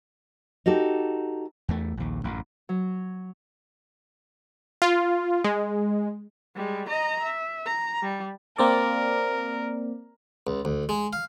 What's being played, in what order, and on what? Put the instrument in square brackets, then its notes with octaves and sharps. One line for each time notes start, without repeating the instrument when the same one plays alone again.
[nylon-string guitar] D#4 F#4 G4 A4
[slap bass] E2 A3
A#1 D#2
A1 F#2
[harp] F#3
[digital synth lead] F4
G#3
[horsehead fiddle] G3 G#3
D#5 A#5
E5
A#5
G3
[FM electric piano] A#3 C4 D5 [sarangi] A#4
[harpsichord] C#2
D2
G#3
F5